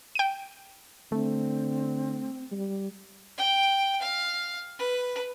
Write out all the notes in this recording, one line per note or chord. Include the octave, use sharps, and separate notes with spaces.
G5 D#7
D3 A3 C4
G3
G5
F5
B4